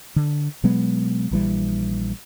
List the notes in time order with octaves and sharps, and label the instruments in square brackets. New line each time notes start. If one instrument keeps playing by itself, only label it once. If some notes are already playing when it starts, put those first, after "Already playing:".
[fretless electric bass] D3
B2 F#3 G#3 B3
A#1 E3 G3